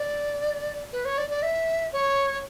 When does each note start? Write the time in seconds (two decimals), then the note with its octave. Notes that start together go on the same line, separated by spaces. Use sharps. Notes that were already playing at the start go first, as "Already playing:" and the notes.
Already playing: D5
0.93 B4
1.05 C#5
1.18 D5
1.30 D5
1.43 E5
1.93 C#5